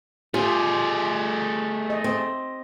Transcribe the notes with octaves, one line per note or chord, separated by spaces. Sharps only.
A3 F4 G4 G#4
D#5
C4